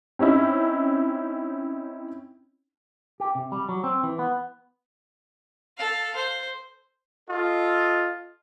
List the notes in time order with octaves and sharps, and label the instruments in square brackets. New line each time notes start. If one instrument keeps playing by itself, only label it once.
[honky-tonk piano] C4 C#4 D#4 E4
[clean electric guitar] G4
C3
G3
F#3
C4
E3
B3
[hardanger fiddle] A4 F5
C5
[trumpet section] F4 A4 D#5